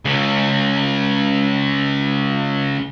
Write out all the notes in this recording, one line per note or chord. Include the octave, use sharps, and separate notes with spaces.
C#2 C#3